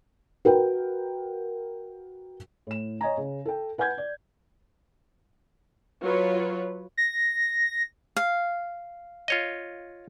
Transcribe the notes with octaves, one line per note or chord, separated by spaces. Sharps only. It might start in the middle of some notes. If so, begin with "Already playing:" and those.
F#4 A#4 B4 G5
A2 E7
C#5 D#5 G#5 A#5
C#3
A4 G5
B4 F#5 G#5 G6 G#6
D5
F#3 F4 B4 C#5
A#6
F5
F4 C#5 D#5